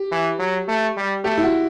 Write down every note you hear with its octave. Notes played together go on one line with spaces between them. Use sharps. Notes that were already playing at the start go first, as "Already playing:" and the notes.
Already playing: G4
E3
F#3
A3
G3
A3 G4
E4
F#4